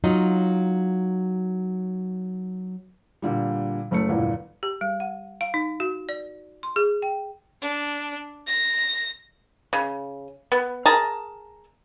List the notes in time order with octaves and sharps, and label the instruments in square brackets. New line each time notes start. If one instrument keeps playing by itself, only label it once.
[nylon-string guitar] F#3 D#4 F4
[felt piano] A#2 D3 G3
F#1 A3 C#7
G1 E2 A#2 E3
[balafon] G4
G3
F#5
F5
D#4
F#4
D5
C6
G#4
G5
[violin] D4
A#6
[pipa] C#3
B3
G#4 A#4 A5 A#5